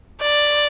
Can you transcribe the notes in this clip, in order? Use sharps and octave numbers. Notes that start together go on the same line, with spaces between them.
D5